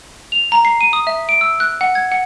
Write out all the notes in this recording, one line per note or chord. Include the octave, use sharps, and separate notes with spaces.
F7
A#5
C7
D#7
D#6
E5
D7
E6
F#6
F#5
G#6
F#5